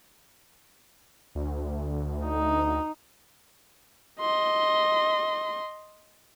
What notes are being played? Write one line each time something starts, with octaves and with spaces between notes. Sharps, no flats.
D2
D#4
D#5 C6